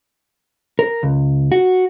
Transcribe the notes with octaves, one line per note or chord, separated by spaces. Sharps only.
A#4
C#2
F#4